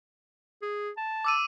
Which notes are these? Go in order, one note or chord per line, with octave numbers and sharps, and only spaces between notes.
G#4
A5
D6 E6 D#7